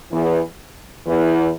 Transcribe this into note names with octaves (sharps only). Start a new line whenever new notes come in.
E2 E3
E2 E3